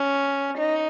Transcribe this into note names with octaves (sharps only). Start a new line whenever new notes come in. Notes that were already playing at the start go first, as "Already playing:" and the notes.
Already playing: C#4
D#4